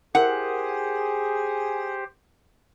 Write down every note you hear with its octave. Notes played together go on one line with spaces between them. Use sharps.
E4 G4 G#4 A#4 C5 F#5